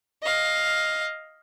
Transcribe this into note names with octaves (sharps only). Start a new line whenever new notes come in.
D#5 F5